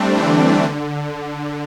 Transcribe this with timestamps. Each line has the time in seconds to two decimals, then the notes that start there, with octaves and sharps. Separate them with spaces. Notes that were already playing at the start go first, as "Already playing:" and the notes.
Already playing: G3 A3 C4 D4
0.17 D3 E3
0.64 D3